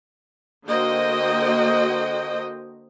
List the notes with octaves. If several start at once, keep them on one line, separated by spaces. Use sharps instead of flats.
D3 A#3 F#4 C5 D#5 G5